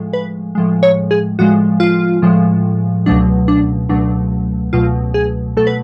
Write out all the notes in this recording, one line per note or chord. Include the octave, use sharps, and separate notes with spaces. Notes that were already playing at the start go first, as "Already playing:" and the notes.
Already playing: A2 F3 G#3
B4
A2 F3 G#3
C#5
G#4
A2 F3 G#3 F#4
F4
A2 F3 G#3
C#2 B2 F#3 A3 D4
D4
C#2 B2 F#3 A3 D4
C#2 B2 F#3 A3 F4
G#4
B2 F#3 A3 A4
B4